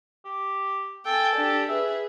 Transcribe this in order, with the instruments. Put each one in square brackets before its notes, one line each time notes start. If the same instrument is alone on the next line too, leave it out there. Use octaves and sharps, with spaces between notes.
[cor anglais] G4
[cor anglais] A4 [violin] G5 G#5
[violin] D4 G4
[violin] G#4 B4 [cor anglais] E5